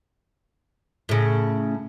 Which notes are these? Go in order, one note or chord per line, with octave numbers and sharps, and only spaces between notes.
A2 C#3